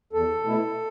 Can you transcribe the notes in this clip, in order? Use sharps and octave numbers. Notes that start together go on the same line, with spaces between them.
E2 A4
B2 A3 E4